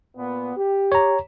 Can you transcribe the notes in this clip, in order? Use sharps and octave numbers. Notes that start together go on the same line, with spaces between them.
A#2 B3
G4
C#5 A#5